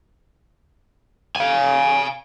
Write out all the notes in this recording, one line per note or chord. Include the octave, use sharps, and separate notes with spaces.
F5 G#5